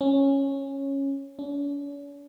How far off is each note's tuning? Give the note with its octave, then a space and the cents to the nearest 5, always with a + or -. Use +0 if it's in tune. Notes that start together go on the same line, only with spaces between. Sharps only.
C#4 -10
C#4 +45